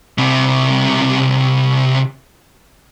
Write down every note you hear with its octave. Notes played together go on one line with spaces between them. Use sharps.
C2 C3